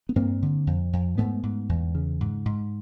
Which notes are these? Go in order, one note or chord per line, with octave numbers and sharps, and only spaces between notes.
B3
G2 A#3 C4
D3
F2
F2
G#2 A3 B3
G#2
E2
C#3
G#2
G#2